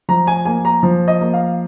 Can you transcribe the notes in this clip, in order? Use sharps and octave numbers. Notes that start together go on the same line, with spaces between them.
F3 A#5
G#5
A#3 G#5
A#5
F3
D#5
A#3
F5